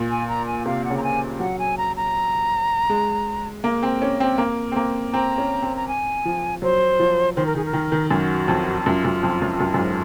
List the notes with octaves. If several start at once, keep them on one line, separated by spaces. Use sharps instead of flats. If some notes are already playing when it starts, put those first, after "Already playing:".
Already playing: A#2
G#5
A#5
G#5
C3 F5
F#5
C#3
A#5
G#5
F#3 F#5
G#5
A#5
A#5
G#3
A#3
C4
C#4
C4
A#3
C4
A#3
C4 A#5
C#4
C4
A#5
G#5
F3
F#3 C5
F3
D#3 C5
A#4
D#3 G#4
A#4
D#3
D#3
F#2 F#4
F2
F#2 F4
F#2
F2
F#2
F#2
F#2
G#2